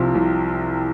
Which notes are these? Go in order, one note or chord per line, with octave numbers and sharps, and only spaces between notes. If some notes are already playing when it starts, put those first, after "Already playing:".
Already playing: C2 C3 F3
C2